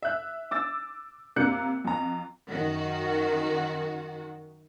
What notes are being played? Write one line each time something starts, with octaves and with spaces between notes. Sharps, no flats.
E5 F#6
D6 E6 A6
C3 A#3 D4 F4 F#6 C#7
F2 A#5
F#2 D#3 F#4